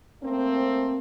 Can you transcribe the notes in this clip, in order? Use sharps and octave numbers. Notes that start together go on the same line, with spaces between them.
A3 A#3 C4